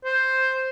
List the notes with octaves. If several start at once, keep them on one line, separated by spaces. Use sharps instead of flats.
C5